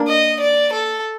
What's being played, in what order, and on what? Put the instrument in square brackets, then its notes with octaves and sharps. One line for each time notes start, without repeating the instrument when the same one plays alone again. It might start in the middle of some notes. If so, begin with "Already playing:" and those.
Already playing: [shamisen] A#3 D4
[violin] D#5
D5
A4